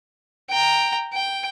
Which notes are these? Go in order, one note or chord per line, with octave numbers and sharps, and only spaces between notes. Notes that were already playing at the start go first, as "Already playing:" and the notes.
G5 A#5
G5